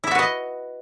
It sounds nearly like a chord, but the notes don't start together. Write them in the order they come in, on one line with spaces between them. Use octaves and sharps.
E4 E5 F#4 B4 D#5